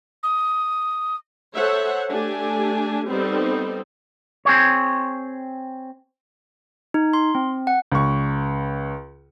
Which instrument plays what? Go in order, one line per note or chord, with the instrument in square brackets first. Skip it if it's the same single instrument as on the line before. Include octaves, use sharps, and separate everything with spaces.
[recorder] D#6
[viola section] A4 C5 C#5 E5 F#5
A3 D4 G4 G#5
G3 B3 C4 D#4 A4 C5
[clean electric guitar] C4 G#4 C#5
[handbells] D#4
C6
C4
F#5
[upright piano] C#2 C#6